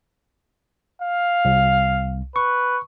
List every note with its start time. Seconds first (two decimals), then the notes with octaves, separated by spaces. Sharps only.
1.02 F5
1.45 C2
2.36 B4 C#6